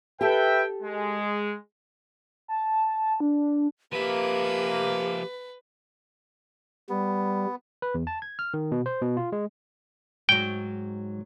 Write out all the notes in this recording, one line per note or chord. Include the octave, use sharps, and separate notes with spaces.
G4 A4 B4 E5 G5
G#3
A5
D4
F3 A#3 G4 B4 E5
G3 B3
B4
E2
A5
G#6
F6
D#3
B2
C5
B2
F4
G#3
G#2 F#3 G5